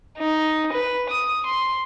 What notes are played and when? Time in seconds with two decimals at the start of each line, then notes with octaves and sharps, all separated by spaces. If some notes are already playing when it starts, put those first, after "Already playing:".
0.18 D#4
0.73 B4
1.09 D#6
1.46 C6